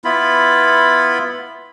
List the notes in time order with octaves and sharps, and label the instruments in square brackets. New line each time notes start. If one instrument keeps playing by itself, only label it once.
[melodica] B3 E4 F4 B5